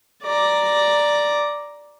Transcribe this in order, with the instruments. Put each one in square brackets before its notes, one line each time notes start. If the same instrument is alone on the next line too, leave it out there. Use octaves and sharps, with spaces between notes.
[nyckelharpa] D5 A#5